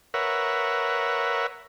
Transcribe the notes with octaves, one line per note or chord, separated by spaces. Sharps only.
A#4 B4 C#5 E5 F#5